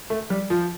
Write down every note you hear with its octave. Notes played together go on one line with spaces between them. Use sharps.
A3
G3
F3